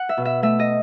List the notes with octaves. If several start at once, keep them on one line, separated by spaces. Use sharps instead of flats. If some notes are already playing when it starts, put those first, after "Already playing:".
Already playing: F#5
E5
B2
E5
A3 E5
D#5